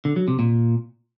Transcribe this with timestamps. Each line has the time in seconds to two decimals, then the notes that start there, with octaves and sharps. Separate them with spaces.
0.05 D3
0.16 F#3
0.28 C3
0.39 A#2